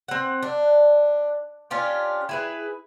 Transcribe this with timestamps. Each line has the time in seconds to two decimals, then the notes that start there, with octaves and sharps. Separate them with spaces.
0.08 C4 F#5
0.43 D4
1.71 C#4 D4 F4 G4
2.29 E4 G#4 B4